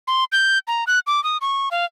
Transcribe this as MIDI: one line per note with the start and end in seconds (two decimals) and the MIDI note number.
0.07 0.24 84
0.32 0.59 91
0.68 0.84 82
0.87 0.99 90
1.07 1.23 86
1.24 1.37 87
1.41 1.69 85
1.71 1.85 77